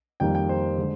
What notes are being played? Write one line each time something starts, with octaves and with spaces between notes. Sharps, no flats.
F2 D#3 G3 A#3 G5
G5
C5
D3 G#3